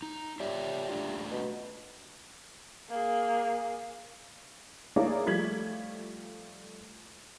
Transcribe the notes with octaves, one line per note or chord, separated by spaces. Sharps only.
D#4
G3 F4 C#5 E5
A3 D4 F4
B2
A#3 G#4
A#3 D#4 E4 G#4 C#5 D5
F3 G3 A3 G#6 B6 F#7